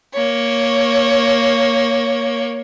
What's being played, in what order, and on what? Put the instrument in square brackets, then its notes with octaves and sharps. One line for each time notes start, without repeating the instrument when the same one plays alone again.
[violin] A#3 C#5